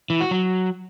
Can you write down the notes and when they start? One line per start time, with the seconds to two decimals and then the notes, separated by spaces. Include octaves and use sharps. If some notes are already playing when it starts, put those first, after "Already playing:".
0.10 E3
0.21 F#4
0.31 F#3